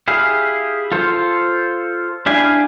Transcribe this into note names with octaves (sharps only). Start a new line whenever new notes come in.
E4 G4 G#4 F5
F4 A4 C5
D4 E4 G4 F5 G#5